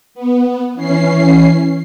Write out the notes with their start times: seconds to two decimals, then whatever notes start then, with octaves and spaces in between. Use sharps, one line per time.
0.15 B3
0.74 E3 C#4 C7